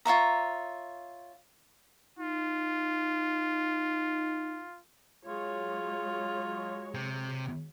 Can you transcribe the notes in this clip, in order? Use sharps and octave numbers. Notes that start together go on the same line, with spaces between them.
F4 C#5 E5 A#5
D#4 F4
F#3 G#3 F4 C#5
C3